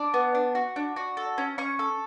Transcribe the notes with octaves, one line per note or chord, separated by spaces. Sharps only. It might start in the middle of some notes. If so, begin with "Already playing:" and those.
Already playing: D4 D6
B3
D4
F#4
D4
F#4
A4
C#4
C#4 C#6
A4